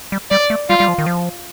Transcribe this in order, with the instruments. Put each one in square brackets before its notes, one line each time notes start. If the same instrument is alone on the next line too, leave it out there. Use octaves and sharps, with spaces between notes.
[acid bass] G3
[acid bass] G3 [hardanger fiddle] D5
[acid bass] A3
[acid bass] G3 [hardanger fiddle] F4
[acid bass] G3
F3
D#3
F3